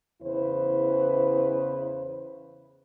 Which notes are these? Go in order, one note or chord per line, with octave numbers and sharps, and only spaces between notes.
E2 C#3 E4 B4 C5